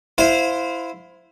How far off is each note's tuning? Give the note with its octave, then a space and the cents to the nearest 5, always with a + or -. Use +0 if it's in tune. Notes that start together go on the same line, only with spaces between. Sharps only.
E4 +10 C5 -10 F5 +25